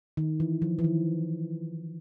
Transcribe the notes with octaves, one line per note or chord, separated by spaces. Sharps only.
D#3
E3
F3
E3
D#3